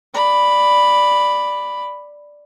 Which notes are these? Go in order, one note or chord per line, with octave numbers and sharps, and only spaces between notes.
D5 B5